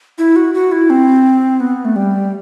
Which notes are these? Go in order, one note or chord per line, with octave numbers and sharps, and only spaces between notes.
E4
F#4
F#4
E4
C4
B3
A3
G3